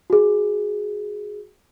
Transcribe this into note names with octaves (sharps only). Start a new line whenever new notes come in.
F#4 G#4